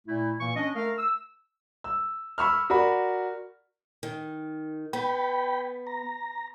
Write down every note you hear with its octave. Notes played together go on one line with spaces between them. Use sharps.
A#2 A3 E4
A#2 E3 A#3 C#6
C#4 D4 D#5
A3 A#4 F5
E6
E6
B5 C#6 E6 F6
F#4 A#4 D5 B5
D#3
B3 G5 B5
A#5